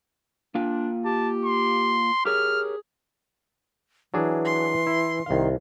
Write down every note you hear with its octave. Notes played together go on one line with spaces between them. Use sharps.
A#3 D4 F4 G5
G4 A5
C6
G4 G#4 A#4 C#5 F6
E3 F#3 D4 G#4
C6
E4
C2 D#3 F5